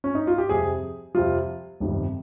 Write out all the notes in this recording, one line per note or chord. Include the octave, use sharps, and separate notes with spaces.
C#4
D#4
F4
G4
F2 C3 G3 G#4
F2 C3 G3 F4
G1 F2 C3 D#3 G3